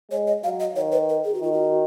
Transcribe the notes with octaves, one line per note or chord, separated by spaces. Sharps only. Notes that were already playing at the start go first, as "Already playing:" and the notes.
G#3 C#5
D#5
F#3 F5
D#5
D#3 C#5
B4
A#4
G#4
F#4
D#3 F4
F#4